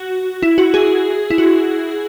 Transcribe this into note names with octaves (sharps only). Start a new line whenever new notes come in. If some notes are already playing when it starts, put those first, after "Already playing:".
Already playing: F#4
E4
F#4
G#4
E4
F#4